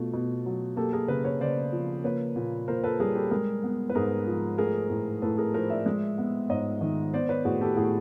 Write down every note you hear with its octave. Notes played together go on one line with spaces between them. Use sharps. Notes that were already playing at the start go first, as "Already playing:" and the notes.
Already playing: B2 A3 F4
B2
F#3
A#3 G4 A4
G#4 A#4
C#3 A4 B4
B4 C#5
C#3 C5 D5
F3
A#3 B4 C#5
A#2
A#2 A#4 C5
A4 B4
G3 G#4 A#4
G4 A4
G#3 G#4 A#4
B3
B4
G#2 G#4 A#4
F3
A3 G#4 A#4
A2
A2 A4 B4
G#4 A#4
F3 A#4 C5
D5 E5
G#3
B3
G#2 C#5 D#5
D#3
B3 C5 D5
B4 C#5
A2 F#4 G#4
G4 A4
A2 F#4 G#4